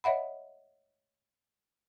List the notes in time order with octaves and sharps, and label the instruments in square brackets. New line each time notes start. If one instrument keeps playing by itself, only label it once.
[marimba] C#5 D#5 E5 F#5 B5